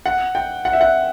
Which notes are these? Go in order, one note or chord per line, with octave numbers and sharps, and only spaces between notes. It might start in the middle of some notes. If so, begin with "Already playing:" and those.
F#5
G5
F#5
E5
F#5